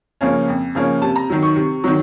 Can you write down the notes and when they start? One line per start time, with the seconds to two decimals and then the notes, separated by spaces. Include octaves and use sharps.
0.21 C#3 F3 A#3 C#4
0.48 F2
0.75 C#3 F3 A#3 C#4
1.02 C3 A5
1.16 A#5
1.30 D#3 F#3
1.43 C#6
1.56 C3
1.84 D#3 F#3